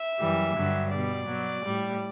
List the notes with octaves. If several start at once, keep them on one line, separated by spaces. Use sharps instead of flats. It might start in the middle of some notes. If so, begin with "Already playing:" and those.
Already playing: E5
F#2 E3 G3
G2 D3 F#3
B2 G3 D5
B2 F#3
A2 G3